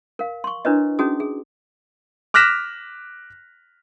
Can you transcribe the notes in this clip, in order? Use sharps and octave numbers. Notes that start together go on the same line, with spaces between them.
A#4 F5
C6 C#6
D4 E4 A#4 B4 C#5 D#5
C#4 D#4 F#4 G#4 D#6
G#4
D6 F6 F#6 A#6 B6 E7